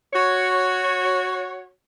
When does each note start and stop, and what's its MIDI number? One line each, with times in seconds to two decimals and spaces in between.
0.14 1.70 66
0.14 1.70 73